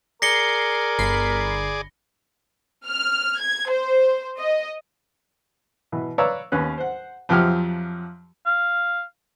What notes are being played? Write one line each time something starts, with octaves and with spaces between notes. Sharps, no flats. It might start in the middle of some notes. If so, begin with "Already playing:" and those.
G#4 A#4 D5 A#6 C7 C#7 G7
G1 B5 C7
F6
G#6
C5
D#5
B2 E3
B4 C#5 D5 F5 A#5 E6
D#2 B3 C#4 F#6
C5 F#5
F2 F3 F#3 G4 E5 F6
F5